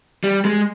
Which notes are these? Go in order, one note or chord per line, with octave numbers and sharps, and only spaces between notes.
G3
G#3